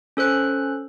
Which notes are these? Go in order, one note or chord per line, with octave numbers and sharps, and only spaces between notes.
C#4 A4 C5 F#6